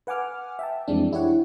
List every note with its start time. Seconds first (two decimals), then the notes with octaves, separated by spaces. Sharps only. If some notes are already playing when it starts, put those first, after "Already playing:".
0.07 B4 F#5 G#5 D6 F6
0.59 E5 G5 A5
0.88 F2 E3 G3 G#3 C4 D4
1.13 E4 G4 C#5 F#5